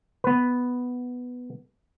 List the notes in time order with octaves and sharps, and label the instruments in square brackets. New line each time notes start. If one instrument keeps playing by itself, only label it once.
[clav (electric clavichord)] B3 B4